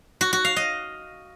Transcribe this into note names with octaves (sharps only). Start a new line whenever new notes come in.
F#4
F#4
F5
D#5